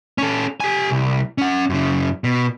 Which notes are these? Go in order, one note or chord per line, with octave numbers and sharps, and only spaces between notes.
C#4 A4
G4 G#5
C2
C#4 F#5
F#2 C#3
B2